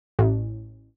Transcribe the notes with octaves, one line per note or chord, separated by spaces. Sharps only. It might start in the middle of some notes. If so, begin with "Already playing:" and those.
A1